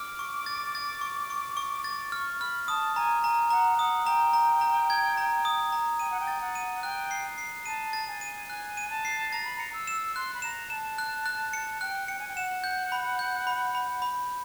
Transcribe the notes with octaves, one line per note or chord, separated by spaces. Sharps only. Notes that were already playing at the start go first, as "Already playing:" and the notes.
Already playing: D6 F6
C#6
A6
A6
C#6
C#6
C#6
D6 A6
C#6 F6
B5 F6
A5 D#6
G#5 A#5
G#5 A#5
F#5 A#5
F#5 D#6
G5 A#5
A#5
A#5
G#6
A#5
D#6
A#5
G5 D#7
F#5
G5
A6
F#5
D#7
G5 F#6
C7
C7
A5 D#7
A6
G#5
D#7
G#5 F#6
D#7
A5
C7
A#5 A6
B5
A#5 C#7
E6
E7
C6 F#6
B5
A#5 E7
A5 E7
F#6
F#6
C#7
G5 F#6
G5 C#7
G#5
G5
F#5 E7
G6
B5
G6
B5
B5
B5